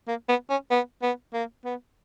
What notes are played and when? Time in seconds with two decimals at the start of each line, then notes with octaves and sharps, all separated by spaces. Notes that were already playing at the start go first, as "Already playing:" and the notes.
0.08 A#3
0.29 B3
0.50 C#4
0.71 B3
1.02 B3
1.34 A#3
1.65 B3